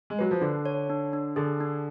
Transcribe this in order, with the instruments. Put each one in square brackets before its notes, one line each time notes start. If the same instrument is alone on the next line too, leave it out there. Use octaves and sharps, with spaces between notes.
[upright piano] G#3
[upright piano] F#3 [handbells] B4
[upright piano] F3
[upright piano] D3 [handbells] D4
[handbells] C#5
D4
D4
[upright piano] D3 [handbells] G#4
[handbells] D4